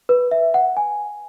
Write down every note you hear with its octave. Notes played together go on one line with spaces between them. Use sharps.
B4
E5
F#5
G#5